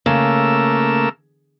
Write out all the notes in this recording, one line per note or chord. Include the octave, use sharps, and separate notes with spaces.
C#3 A3 A#3 E6